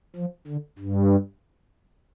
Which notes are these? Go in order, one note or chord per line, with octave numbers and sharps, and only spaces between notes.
F3
D3
G2